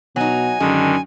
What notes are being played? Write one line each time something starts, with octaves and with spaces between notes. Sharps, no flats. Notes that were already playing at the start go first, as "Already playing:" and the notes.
B2 F#3 D#4 G#5
F#2 D3 D#3 G#3